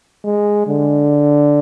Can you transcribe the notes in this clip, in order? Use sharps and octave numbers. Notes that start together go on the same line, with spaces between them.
G#3
D3